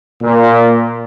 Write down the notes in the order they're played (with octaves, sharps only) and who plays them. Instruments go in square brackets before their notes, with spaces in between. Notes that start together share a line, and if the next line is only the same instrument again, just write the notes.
[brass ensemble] A#2